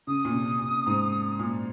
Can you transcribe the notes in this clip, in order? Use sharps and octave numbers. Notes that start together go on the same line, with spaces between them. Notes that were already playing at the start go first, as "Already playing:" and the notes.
C#3 D#6
A#2
C3
A#2
G#2
A#2